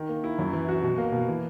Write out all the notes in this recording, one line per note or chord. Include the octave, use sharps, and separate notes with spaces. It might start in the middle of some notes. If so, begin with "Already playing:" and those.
Already playing: D#3
A#3
E4
F#2
E3
F#4
B2
A#3
B2
E3